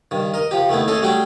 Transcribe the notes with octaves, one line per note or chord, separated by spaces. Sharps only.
G2 D#3
A#4 D#5
F3 G4
D#3 A3 B3 E4
A3 C#4 G#4 A4 D#5
G3 A3 D4 F#4 G#4 G5